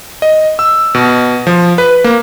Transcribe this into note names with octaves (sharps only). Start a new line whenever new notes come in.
D#5
E6
B2
F3
B4
A#3